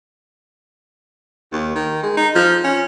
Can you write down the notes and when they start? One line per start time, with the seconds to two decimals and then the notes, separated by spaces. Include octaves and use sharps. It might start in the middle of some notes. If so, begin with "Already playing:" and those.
1.52 D#2
1.75 D#3
2.03 G#3
2.17 D#4
2.35 F3
2.64 C#4